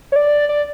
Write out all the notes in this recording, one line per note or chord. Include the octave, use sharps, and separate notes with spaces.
C#5
D5
D5